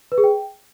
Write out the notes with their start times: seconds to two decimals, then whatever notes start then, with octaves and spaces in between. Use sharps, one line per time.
0.12 B4
0.18 G#4
0.24 G5